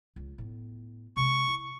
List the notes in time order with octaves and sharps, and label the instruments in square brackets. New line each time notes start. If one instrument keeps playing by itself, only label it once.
[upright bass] C#2
A2 B3
[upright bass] C3 G#3 [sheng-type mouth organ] C#6
[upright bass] E4